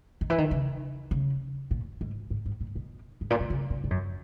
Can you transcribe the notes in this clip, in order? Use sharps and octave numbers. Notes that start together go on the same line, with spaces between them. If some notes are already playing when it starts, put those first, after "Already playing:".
D#3
E3
D#3
C#3
C#3
A#2
G#2
G#2
G#2
A#2
B2
G#2
A#2
B2
C#3
C#3
G#2
F#2